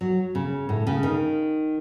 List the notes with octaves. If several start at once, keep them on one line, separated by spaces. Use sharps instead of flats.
F#3
C#3
A2
C#3
D#3